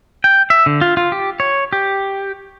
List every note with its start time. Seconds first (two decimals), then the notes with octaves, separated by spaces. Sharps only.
0.24 G5
0.50 E5
0.66 D3
0.81 F4
0.97 F4
1.12 G4
1.40 C#5
1.73 G4